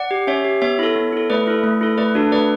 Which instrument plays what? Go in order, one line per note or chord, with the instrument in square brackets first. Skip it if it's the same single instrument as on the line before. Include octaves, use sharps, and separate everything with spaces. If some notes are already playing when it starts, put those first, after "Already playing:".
Already playing: [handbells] D5 F#5
G4
C#4 C#5 E5
G4
B3 C#5 E5
E4 A4
B3
E4 A4
A3 B4 D5
E4 A4
A3
E4 A4
A3 B4 D5
D4 F#4 A4
A3 B4 D5